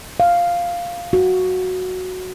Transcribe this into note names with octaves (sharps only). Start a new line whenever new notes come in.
F5
F#4